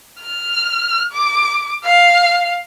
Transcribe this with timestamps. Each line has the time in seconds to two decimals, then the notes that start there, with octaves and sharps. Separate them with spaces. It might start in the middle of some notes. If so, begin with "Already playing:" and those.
0.20 F6
1.12 D6
1.85 F5